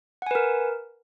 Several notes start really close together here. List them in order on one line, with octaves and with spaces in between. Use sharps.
F#5 G#5 B4 A#4